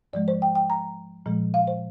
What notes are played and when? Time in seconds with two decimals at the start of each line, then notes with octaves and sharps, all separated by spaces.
0.13 G#2 F3 G#3 D5
0.28 C5
0.42 G5
0.56 G5
0.70 A#5
1.26 A#2 F3 G#3
1.54 F5
1.67 C5